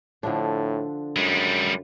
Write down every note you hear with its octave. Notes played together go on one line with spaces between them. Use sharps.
A2 D3 F3 D4
F#2 G3 G#3